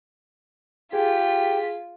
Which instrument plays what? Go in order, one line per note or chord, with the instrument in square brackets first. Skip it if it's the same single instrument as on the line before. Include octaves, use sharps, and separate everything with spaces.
[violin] F4 B6 [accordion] G4 G5 [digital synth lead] G#4